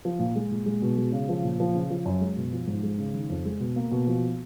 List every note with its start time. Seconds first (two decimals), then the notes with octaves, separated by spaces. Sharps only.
0.05 F3
0.19 A#2
0.36 G#3
0.51 A#2
0.66 G#3
0.82 B2
0.97 G#3
1.12 C#3
1.29 F3
1.44 A#2
1.60 F3
1.75 C#3
1.90 F3
2.06 F#2
2.21 G#3
2.37 B2
2.52 F3
2.67 G#2
2.83 G#3
2.99 C#3
3.14 D#3
3.30 F2
3.45 G#3
3.60 B2
3.76 A#3
3.91 B2
4.07 F3